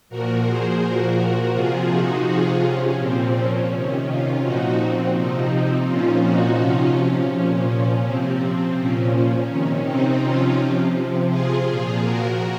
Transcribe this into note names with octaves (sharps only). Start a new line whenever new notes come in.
A#2 F3 F#4 A#4
G#4 C5
A#2 F3 F#4 A#4
C3 F3 F4 G#4
D#4 F#4
C3 F3 F4 G#4
C#4
A#2 F3 C4
C#4
C3 D#3
C#4 F4
A#2 F3 D#4 F#4
C4
C3 F3 C4 D#4
A#2 F3 C#4 F4
D#4 F#4
C3 F3 C#4 F4
C#4
A#2 F3
C#4
C3 F3 C4
A#2 F3 C#4
C3 D#3 C#4
C4 D#4
C3 F3 C#4 F4
C3 F3
F4 G#4
A#2 F3 F4 G#4
F#4 A#4